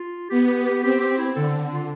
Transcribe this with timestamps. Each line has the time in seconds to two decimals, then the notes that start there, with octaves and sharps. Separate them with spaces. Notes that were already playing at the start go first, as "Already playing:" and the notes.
Already playing: F4
0.30 B3 G4
0.48 G4
0.65 G4
0.83 C4 G4
1.00 G4
1.18 E4
1.36 D3 A4
1.71 F4